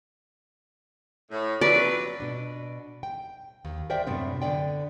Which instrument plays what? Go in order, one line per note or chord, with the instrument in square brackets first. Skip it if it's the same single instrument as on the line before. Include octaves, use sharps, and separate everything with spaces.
[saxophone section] A2
[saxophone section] F2 F#3 B4 [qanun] D5
[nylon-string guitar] B2 D4
G5
D#2
A#4 C5 D5 E5 G5
F#2 A2 C3 B3 C4 D4
D3 B3 D5 G5